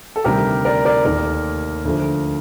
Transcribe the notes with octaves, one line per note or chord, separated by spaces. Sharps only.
A4
D2 C3 D#3 G3 G4 A#4
A#4 D5
A#4 D5
D#2 D#3 A3 A#4 D5
D2 D3 F3 A3